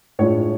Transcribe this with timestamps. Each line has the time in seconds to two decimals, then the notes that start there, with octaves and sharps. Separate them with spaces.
0.19 A2 G#3 D4 F4 C#5